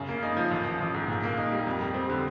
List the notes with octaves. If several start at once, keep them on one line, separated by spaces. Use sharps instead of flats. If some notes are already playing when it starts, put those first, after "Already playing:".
Already playing: F#2 C#3
A#3
D#4
F3
A1
F3
A1
G#2
A#2
A#3
D#4
G3
F2
G3
C4
D3